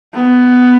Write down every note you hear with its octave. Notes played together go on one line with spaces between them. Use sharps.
B3